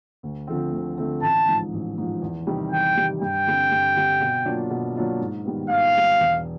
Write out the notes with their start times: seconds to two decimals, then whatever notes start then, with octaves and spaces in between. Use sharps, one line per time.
0.23 D2
0.47 D3 F3 A3 C4
0.72 D2
0.98 D3 F3 A3 C4
1.22 A1 A5
1.48 G#2 F3
1.72 A1
1.98 G#2 F3
2.22 E2
2.47 C3 D#3 G3
2.71 E2 G5
2.97 C3 D#3 G3
3.21 G2 G5
3.47 D3 G3 C4
3.71 G2
3.96 D3 G3 C4
4.21 B2
4.45 F#3 A#3 D4 F4
4.70 B2
4.96 F#3 A#3 D4 F4
5.20 G#2
5.45 D#3 G3 B3
5.69 G#2 F5
5.95 D#3 G3 B3
6.20 E1